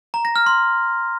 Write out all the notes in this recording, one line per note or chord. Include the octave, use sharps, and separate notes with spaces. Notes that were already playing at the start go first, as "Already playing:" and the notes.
A#5
A#6
F6
C6